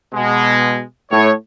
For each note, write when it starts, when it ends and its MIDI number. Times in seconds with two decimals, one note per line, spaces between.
0.13 0.81 47
0.13 0.81 56
1.11 1.31 45
1.11 1.31 73